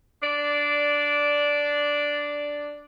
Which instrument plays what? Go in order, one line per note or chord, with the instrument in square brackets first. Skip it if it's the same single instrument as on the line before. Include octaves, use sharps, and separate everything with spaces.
[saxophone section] D4 D5